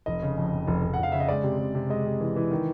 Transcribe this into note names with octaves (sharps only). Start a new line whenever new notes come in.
F1 D#5
C#3
F2
F2
F1
F1
F#5
F1 F5
C#3 E5
D#5
G#3 D5
C3
C3
C3
G#3 D#5
C3
E3
E3
D#3